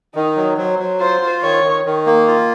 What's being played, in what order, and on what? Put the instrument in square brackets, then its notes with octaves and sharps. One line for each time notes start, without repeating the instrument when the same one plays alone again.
[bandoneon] D#3 [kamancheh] D#4
[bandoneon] F#3
[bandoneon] F#3 [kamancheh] C5
[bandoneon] F#3
[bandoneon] F4 [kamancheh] C5
[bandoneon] F4
[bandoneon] D#3 [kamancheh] C#5
[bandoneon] D#3
D#3
A#3
F4